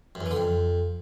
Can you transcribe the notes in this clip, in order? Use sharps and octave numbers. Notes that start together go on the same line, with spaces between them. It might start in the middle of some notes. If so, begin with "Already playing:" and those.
F#2
E2
E3
D3
F2